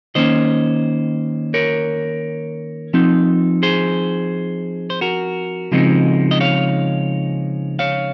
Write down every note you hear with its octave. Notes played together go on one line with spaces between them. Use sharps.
D#3 A#3 C#4 C5 D#5
A#4 C#5
F3 C4 D#4
G#4 C5
C5
F#4 A#4
C#3 F3 G#3 C4 D#4
D#5
C#5 F5
C#5 F5